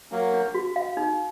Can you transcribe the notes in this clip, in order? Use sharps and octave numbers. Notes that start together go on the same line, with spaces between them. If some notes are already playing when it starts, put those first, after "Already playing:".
F#3 A#3 D4
D4
F#4
F5
D#4